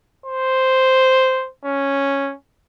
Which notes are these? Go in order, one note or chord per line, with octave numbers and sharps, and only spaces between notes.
C5
C#4